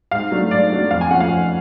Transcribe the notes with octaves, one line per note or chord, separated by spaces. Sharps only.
G#2 F5
F#3 A3 D4
G#2 D5
F#3 A3 D4
F2 F5
G#5
F3 A3 C#4 F#5
F5
F2